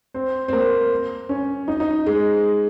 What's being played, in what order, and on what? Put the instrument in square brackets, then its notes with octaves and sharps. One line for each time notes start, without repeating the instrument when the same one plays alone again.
[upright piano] C4
C4
A#3
C#4
D#4
D#4
G#3